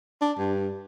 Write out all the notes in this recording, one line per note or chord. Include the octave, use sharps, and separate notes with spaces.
D4
G2